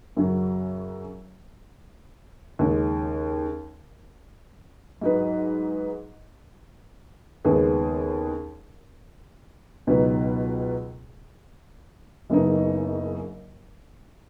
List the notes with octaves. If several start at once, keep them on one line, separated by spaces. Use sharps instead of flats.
F#2 C#3 F#3
D#2 C#3 G#3
G#2 F#3 D#4 B4
D#2 C#3 G#3 B3 G#4
C#2 B2 F#3 D#4 B4
F#1 F#2 C#3 B3 D#4